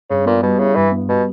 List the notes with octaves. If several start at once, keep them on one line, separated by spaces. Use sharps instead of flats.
G2 C#3
A#2 B3
B2 G3
C#3 E4
G2 E3
B3
B2 G3